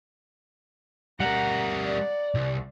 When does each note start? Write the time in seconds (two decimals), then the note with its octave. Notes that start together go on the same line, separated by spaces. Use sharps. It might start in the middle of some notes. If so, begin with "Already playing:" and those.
1.20 G3 A#4 F#5 A#5
1.85 D5
2.35 C2